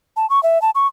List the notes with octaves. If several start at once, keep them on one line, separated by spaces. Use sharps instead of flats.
A5
C#6
E5
A5
C#6